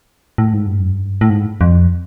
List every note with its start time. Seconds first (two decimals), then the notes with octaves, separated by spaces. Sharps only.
0.38 A2
0.53 G#2
0.67 G2
0.79 F#2
0.92 G2
1.21 A2
1.30 G#2
1.61 F2